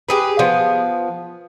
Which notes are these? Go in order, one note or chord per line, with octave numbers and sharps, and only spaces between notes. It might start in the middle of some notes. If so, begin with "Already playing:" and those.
G4 G#4 B4
F3 B3